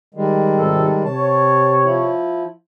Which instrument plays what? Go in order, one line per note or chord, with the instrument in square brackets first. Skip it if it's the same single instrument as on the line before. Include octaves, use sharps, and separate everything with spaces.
[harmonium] D#3 G3 G#3
[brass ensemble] G#1 C3 A4
[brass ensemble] C3 C#5 [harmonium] A5
[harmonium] F3 E4